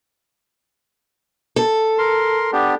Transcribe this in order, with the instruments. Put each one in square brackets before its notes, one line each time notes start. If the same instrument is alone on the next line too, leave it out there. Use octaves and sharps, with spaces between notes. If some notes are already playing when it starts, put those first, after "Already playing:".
[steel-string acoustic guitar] A4
[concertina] A#4 C6
B3 D4 G4